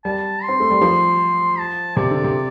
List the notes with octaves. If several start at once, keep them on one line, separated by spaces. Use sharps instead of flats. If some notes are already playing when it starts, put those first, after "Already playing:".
G3 A5
C6
C4
A3
G3
F3
A5
C3 D5
D3
C3